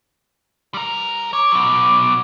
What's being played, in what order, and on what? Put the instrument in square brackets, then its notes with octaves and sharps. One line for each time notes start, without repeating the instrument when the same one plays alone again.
[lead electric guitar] G3 A#4
[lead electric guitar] C#5 [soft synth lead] D6
[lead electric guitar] B2 F#3